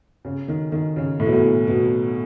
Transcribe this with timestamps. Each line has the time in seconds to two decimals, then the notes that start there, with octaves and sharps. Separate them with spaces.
0.25 C#3
0.48 D#3
0.72 D#3
0.96 C#3
1.20 A2
1.26 B2
1.33 A2
1.67 B2